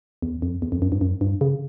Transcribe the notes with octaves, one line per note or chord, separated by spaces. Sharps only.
E2
F2
E2
F2
F#2
G2
F#2
G2
C#3